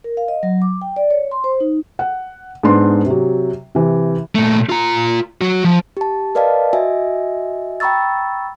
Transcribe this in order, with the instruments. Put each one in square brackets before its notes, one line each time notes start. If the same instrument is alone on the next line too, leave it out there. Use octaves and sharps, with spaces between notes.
[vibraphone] A#4
F5
D#5
F#3
D6
G5
D5
C#5
C6
C5
D#4
[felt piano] F#5
G#2 B3 D4 C6
C3 F#3
C3 E3
[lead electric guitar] A#2 A3
F4 A#5
F#3 F#4
F3
[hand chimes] G4 A5
A#4 B4 D5 D#5 F5 A5
F#4 D#5 E5 G#5
G5 A#5 B5 C#6 E6 A6